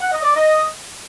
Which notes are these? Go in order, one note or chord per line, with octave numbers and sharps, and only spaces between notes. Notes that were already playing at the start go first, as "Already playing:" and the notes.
F#5
D#5
D5
D#5